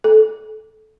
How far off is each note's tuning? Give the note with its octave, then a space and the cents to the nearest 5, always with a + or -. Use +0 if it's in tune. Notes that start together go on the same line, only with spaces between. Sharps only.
A4 -20